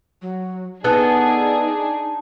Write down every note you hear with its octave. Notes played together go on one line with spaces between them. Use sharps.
F#3
B3 D4 D#4 G#4 A4 A5